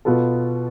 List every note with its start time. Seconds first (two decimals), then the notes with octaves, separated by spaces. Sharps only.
0.05 B2 B3 F4 A4